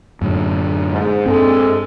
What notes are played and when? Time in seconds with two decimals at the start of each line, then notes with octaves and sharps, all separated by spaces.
0.22 F#2 A2 D3
0.90 G#2
1.26 G2 C3 G#3 C4 A4